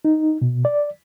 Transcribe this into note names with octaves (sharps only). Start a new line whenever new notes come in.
D#4
B2
D5